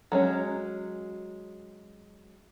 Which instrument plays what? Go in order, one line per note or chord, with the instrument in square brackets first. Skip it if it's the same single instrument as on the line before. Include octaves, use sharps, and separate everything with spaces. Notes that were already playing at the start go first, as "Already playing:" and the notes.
[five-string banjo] F#3 G#3 C#4